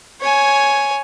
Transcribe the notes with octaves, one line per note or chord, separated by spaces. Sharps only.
C#5 G#5